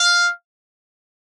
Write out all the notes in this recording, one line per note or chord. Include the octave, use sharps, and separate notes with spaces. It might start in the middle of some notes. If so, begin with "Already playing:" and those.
Already playing: F5